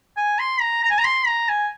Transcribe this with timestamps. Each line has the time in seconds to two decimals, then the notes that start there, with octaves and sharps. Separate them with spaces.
0.17 G#5
0.39 C6
0.61 A#5
0.83 A#5
0.91 G#5
0.98 A#5
1.04 C6
1.27 A#5
1.49 G#5